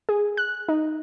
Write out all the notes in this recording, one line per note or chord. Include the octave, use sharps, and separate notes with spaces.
G#4
F#6
D#4